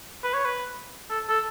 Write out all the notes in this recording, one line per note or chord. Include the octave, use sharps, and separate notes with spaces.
B4
C#5
B4
A4
A4